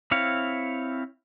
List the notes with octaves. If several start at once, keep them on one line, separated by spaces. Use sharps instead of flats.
C4 E4 C#5 F5